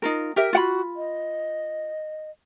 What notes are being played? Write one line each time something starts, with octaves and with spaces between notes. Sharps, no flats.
D#4 F4 A#4
G4 A#4 E5
F4 F#4 F#5 B5
D#5